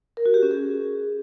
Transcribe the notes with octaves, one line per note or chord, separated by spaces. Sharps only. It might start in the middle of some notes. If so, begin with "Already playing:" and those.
A#4
F#4
G4
C#4
G#4